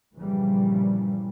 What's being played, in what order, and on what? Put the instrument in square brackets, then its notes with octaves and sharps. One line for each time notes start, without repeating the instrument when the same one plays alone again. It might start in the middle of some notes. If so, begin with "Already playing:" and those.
[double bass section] G2 A#2 C#3 E3 F3 G3